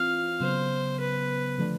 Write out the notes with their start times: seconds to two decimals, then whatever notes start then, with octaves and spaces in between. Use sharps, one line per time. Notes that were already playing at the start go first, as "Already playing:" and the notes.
Already playing: E3 C4 F4 F5
0.40 C#3 F#3 B3 C5
0.99 B4
1.58 D3 F3 A3 D4